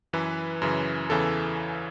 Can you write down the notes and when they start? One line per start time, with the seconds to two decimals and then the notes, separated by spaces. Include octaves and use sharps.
0.13 F#2 E3 B4
0.62 F#2 C#3 E3
1.10 E2 C#3 E3 A4